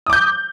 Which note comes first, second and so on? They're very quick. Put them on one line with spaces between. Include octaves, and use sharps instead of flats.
D#6 D6 G6